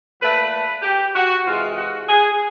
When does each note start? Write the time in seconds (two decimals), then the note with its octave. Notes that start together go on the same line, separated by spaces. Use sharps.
0.21 A#2 F3 A3 B4
0.52 B4
0.82 G4
1.15 F#4
1.45 C3 E3 G#3 F4
1.76 F#4
2.08 G#4